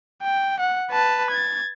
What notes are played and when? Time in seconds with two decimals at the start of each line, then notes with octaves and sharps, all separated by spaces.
0.23 G5
0.60 F#5
0.91 B4 A5
1.31 G#6 A6